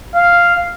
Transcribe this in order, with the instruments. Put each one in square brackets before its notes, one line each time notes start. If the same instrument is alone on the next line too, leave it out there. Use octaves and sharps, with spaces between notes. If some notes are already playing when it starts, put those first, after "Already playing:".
[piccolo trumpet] F5